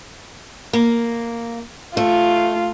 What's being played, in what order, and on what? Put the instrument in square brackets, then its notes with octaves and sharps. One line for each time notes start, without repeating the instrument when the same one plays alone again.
[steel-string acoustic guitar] A#3
[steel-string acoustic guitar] A3 [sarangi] F4